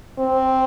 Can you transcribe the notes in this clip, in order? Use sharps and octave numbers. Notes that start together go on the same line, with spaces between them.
C4